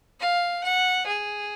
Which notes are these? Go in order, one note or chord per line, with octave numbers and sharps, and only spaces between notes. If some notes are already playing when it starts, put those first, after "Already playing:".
F5
F#5
G#4